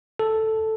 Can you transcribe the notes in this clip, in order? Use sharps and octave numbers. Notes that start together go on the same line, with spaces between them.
A4